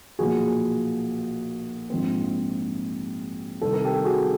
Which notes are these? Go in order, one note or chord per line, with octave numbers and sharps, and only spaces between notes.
B1 A#2 F3 A#3 F#4 G#4
A#1 G#2 F3 G#3 C4
C2 C3 D#3 A4
A#4
G4 A4
F#4 G#4